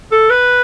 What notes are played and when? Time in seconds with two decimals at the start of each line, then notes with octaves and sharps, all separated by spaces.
0.12 A4
0.31 B4